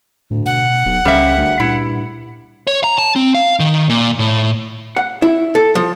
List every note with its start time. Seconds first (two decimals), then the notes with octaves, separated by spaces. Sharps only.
0.31 D2 A2
0.46 B2 F#5
0.86 D#1 B1
1.05 C#2 C#3 G3 A#3 E5
1.38 D2
1.60 G2 A#2 E4
2.67 C#5
2.84 A#5
2.98 A5
3.16 C4
3.34 F5
3.60 D#3
3.89 A#2
4.19 A2
4.96 F#5
5.22 E4
5.55 A4
5.75 F3